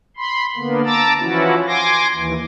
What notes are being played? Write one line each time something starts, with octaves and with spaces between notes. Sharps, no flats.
B5 C6
D3 A#3 B3
A5 A#5 D6 E6 A6
E3 F3 C#4 E4 F#4
G#5 C6 D6 A#6
D#2 E3